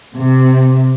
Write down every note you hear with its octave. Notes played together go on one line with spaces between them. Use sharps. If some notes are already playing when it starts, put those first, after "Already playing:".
C3